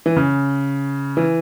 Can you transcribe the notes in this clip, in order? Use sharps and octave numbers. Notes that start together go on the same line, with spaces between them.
E3
C#3
E3